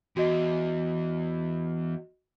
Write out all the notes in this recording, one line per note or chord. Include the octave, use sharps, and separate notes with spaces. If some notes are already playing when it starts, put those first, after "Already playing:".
E2 F#4 D#5